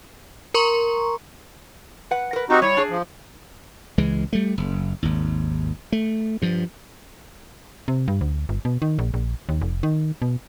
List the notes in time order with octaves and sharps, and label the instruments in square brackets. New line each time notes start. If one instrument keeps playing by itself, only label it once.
[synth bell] A#4 A#5 C6 C#6
[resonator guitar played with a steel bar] B4 F#5
A#4 B4
[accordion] C4 D#4 F#4 [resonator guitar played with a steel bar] G4
[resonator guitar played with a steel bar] G3 E4 [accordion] C#5
[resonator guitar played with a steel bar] D4 G#4
[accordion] F3
[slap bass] C#2 E3 G#3
G3 A3
F#1
G#1 D#2
A3
G2 F3
[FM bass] C3
G2
D2
G1
B2
D#3
A#1
A#1
D#2
F1
D#3
B2